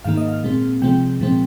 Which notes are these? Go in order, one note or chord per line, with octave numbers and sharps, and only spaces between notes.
G#2 D#3 A#3 F5
D#5
F5
A#2 G#3 C4
C3 F3 G#3 C4 G5
A#2 F3 G#3 C4